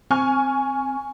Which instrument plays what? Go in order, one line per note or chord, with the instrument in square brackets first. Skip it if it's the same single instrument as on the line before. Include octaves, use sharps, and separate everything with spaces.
[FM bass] C4 [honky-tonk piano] G#5 C#6 F6